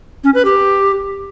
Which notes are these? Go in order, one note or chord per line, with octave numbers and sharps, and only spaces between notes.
C#4
B4
G4